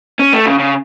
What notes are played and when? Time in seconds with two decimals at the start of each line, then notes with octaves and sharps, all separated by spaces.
0.19 C#4
0.33 A3
0.46 C#3
0.59 C#3